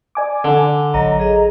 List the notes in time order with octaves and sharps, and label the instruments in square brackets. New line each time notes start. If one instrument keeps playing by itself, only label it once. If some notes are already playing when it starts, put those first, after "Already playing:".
[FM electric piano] D5 G#5 D6
[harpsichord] D3
[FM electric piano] A1 A#5 [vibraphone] F#3 C#5 D#5
[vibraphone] G#4 D#5